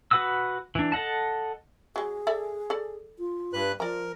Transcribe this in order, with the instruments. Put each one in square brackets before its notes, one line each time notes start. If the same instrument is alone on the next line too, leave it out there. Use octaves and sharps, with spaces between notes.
[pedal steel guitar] F#4 B4 F#5 D#6 E6
E3 D4
A4 D#5 F#5 A5
[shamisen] F#3 G#3 [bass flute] G#4
[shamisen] A4 D5 E5
A4 D5
[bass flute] F4
[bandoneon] G2 B4 F#6
[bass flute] F3 [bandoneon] A#4 [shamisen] D5 A#5